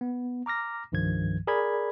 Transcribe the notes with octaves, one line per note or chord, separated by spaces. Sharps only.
B3
A#5 D6 F6 A#6
C2 G2 D#3 F3 G#6
G#4 A#4 D5 B5 G#6